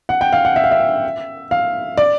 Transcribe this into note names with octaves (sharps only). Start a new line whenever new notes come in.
F#5
G5
F5
F#5
E5
F5
E5
F5
D5